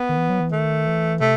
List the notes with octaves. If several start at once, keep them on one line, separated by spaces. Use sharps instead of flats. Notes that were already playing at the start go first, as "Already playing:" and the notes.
Already playing: B3
D#3
E3
F#3
E3
D#3 A3
E3
C3 A3